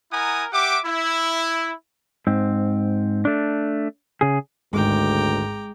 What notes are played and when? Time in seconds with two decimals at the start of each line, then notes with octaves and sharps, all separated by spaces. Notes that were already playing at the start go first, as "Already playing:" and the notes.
0.12 E4 A#4 F#5 G#5 A#5 D#6
0.53 G4 E5 F#5 D6
0.86 E4
2.27 G#2 C4
3.25 A3 D4
4.21 C#3 G#4
4.73 G#1 D2 G#3 G5 A#5 D6